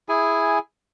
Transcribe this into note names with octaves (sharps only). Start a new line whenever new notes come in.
E4 G#4 G#5